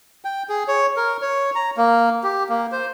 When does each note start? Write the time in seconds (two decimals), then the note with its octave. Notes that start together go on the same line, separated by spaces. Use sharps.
0.25 G5
0.49 G#4
0.68 C#5
0.97 A#4
1.21 C#5
1.55 A#5
1.77 A#3
2.23 G4
2.49 A#3
2.72 C5